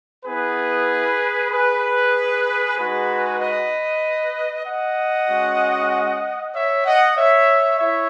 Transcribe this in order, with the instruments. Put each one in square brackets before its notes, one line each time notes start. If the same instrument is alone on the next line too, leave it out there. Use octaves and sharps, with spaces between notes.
[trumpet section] B3 E4 G#4 B4
G#4 B4
G#3 D#4 F#4 G#4 B4
B4 D#5
D#5 F#5
G#3 C#4 F#4
C#5 E5
D#5 F#5
C#5 E5
E4 C#5 E5